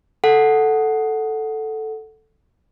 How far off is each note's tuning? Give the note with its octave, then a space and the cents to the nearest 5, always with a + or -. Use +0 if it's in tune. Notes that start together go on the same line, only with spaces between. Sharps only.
A4 +0 F#5 +0